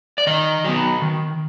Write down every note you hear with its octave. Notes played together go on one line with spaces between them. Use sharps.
D5
D#3 D#5
F#3 B3
D#3